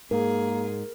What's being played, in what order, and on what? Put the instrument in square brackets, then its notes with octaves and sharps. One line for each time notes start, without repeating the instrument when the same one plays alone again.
[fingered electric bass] G#2 [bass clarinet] A#3 [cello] G#4 [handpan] A#4